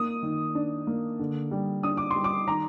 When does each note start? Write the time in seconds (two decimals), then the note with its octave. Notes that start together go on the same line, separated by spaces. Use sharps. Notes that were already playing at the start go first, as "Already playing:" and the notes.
Already playing: A#3 D#6
0.23 D#3
0.55 D4
0.87 A#3
1.19 D3
1.51 G3
1.83 D4 D#6
1.97 D6
2.11 G3 C6
2.24 D6
2.47 D#3 A#5